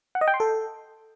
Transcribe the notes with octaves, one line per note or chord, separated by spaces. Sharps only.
F#5
D#5
G5
C6
A4